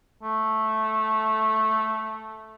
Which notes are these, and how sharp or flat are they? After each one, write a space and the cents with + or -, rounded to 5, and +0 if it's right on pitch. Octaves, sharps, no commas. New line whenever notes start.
A3 -5